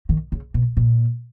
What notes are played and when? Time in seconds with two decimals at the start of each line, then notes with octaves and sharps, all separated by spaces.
0.09 D#3
0.32 C#3
0.54 B2
0.77 A#2